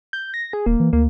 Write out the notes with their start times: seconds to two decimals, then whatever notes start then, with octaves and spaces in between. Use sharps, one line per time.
0.13 G6
0.34 A#6
0.53 G#4
0.66 D#1 A#3
0.80 E3
0.93 D2 A#3